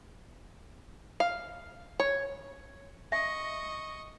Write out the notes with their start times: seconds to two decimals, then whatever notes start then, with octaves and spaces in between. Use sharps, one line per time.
1.20 F5
2.00 C#5
3.12 D#5 E5 C#6